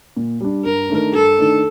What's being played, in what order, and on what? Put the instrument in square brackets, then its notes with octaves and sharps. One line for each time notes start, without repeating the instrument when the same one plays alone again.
[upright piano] A#2
G3 D4
[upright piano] G2 [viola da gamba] A#4
[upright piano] D#3 A3 D4
[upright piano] G2 [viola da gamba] A4
[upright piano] D#3 A3 D4